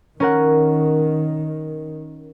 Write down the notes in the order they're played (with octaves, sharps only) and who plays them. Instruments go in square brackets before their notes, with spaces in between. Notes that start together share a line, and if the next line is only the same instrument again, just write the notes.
[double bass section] D#3 [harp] C#4 A#4 F#5